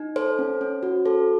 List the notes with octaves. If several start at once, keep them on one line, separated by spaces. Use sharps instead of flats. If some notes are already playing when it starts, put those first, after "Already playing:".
Already playing: D#4
A4 C5
C#4
C#4
F#4
A4 C5